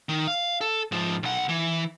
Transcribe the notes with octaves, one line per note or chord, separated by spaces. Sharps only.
D#3
F5
A4
G#2 F3
B1 F#5
E3